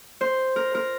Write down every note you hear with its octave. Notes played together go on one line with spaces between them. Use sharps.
C5
A#4
A#4